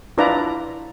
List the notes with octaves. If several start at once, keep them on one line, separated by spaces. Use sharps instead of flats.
D4 E4 F4 B4 D5 A#5